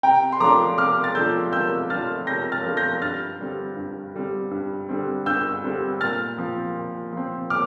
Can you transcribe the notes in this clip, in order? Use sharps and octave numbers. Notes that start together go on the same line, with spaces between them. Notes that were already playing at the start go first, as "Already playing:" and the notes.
C3 G5 A#5
C6
F3 A3 D4 F4 A#5 D6
C3 D6 F6
A6
F3 A3 D4 F4 E6 G6
C3 E6 G6
F3 A3 D4 F4 F6 A6
C3 G6 A#6
F6 A6
F3 A3 D4 F4
G6 A#6
G2 F6 A6
D3 G3 C4
G2
D3 G3 C4
G2
D3 G3 C4
G2 E6 G6
D3 G3 C4
A#2 F6 A6
F3 C4
A#2
F3 C4
A#2 D6 F6